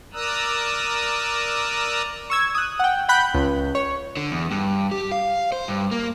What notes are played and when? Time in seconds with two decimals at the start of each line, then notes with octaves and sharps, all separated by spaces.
0.13 A#4 D5 A#5 D#6 E6 F#6
2.30 C#6 E6 G#6
2.55 D#6 F#6
2.79 F#5 G5
3.09 F#5 G5 B5 F#6 G6
3.34 C#2
3.75 C#5
4.17 D3
4.31 E2
4.51 G2
4.91 G4
5.12 F5
5.52 C5
5.68 G2
5.91 A#3